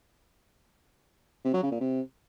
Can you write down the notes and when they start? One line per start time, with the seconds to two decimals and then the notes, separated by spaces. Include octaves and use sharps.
1.45 C3
1.54 F#3
1.63 C#3
1.72 A#2
1.80 C3